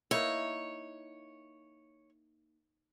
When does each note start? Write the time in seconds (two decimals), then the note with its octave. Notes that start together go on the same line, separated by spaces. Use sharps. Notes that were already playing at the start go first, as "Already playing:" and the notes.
0.11 A#3 D#4 E4 C#5